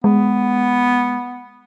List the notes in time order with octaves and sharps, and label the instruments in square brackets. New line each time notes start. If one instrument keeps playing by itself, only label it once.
[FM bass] G#3 [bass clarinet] B3